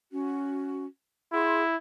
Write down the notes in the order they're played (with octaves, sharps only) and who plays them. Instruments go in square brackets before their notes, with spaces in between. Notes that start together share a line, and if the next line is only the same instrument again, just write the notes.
[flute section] C#4 F#4
[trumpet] E4 [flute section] G#4 F#5 C6